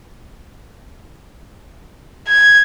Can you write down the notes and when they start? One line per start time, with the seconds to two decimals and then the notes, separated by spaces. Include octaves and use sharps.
2.28 G#6